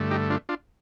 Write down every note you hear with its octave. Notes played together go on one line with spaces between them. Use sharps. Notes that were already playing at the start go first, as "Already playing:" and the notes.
Already playing: G2 D3 A3
D#4 G4
D4 F4
D4 F4